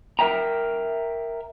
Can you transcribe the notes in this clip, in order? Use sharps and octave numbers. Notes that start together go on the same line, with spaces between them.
A#4 C5 E5 G5 A#5